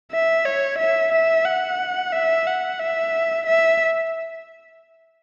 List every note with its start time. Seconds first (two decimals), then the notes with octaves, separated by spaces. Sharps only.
0.12 E5
0.46 C#5
0.79 E5
1.12 E5
1.45 F#5
2.13 E5
2.47 F#5
2.80 E5
3.47 E5